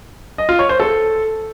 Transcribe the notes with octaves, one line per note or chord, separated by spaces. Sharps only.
D#5
F4
C#5
C5
A4